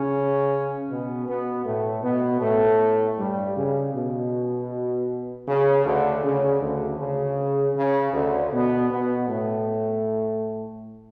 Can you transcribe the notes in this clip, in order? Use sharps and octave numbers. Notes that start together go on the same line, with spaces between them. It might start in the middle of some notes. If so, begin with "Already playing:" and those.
Already playing: C#3 C#4
B2 B3
B2 B3
A2 A3
B2 B3
A2 A3
G2 G3
C#3
B2
C#3
D2 D3
C#3
D2 D3
C#3
C#3
D2 D3
B2 B3
B2 B3
A2 A3